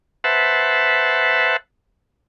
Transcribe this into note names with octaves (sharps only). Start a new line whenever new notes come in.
B4 C5 E5 F#5 A5